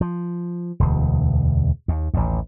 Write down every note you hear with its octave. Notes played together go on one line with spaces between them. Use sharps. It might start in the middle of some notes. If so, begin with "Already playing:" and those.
F3
E1 D2
D#2
A1 D#2